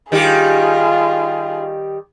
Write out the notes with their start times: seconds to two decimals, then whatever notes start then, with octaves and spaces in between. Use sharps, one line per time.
0.12 D#3 G3 F4 G4 G#4